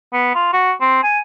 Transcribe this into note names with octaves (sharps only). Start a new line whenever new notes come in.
B3
F4
F#4
C4
G#5